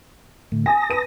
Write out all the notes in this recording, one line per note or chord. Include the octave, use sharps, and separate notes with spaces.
A2 D3 A3
G#5 A5 D#6 A#6
B4 D#7